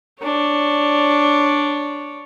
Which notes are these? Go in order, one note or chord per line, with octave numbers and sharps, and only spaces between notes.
D4 C#5